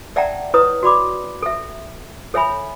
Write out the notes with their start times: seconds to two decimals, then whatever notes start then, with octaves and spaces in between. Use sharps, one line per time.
0.16 D5 E5 F#5 G5 A5 A#5
0.54 E4 B4 C#5 A#5 D#6
0.83 F#4 D5 B5 D6
1.42 A4 E5
2.34 A4 C#5 E5 G#5 B5